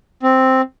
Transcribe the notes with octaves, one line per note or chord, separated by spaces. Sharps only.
C4